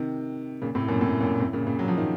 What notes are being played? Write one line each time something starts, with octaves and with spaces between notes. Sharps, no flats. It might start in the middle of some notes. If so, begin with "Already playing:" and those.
Already playing: C3 D#3
A#2 C#3
A2 C3
F#2 A#2
A2 C3
F#2 A#2
A2 C3
A#2 C#3
A#2 C#3
F#3
F3
D#3